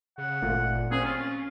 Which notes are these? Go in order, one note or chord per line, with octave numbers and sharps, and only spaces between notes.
C#3 F#5
G#1 A#2 A3 A#3 F4
A#3 C4 C#4 G#4
F4